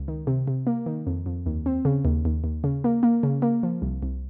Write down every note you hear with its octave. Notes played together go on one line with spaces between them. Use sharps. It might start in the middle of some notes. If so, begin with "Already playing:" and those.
Already playing: C#2
D#3
C3
C3
A#3
D#3
F2
F2
D#2
C4
C#3
D#2
D#2
D#2
C#3
A#3
A#3
C#3
A#3
F3
C2
C2